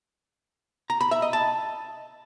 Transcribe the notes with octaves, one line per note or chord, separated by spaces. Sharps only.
A#5
B5
E5
D#5
A5